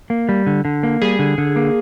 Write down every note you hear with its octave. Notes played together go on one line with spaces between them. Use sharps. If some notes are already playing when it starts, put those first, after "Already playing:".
A#3
G3
D3
D3
A#3
G3 G#4
D3
D3
A#3